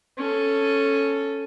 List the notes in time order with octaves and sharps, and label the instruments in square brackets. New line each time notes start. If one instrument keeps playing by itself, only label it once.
[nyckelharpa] C#4 A4